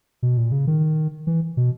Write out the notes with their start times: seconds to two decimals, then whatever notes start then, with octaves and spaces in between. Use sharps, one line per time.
0.23 B2
0.37 A#2
0.52 C#3
0.67 D#3
1.27 E3
1.57 B2